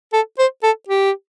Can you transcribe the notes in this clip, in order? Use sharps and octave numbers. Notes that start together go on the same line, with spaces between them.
A4
C5
A4
G4